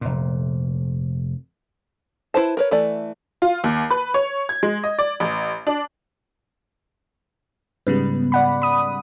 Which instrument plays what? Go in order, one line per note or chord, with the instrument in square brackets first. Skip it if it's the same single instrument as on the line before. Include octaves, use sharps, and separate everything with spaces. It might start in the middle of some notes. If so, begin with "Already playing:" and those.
[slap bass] F1 A#2
[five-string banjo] E4 B4 C5 A5
A#4 B4 C#5
E3 A3 D5
[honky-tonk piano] F4
D#2
B4
C#5
G#6
G#3
D#5
D5
A1
D4
[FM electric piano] G#2 C#3 G3 [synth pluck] B3 B4
[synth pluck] D5 F#5 B5
B5 D#6